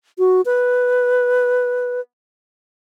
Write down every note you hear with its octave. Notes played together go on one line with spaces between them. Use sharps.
F#4
B4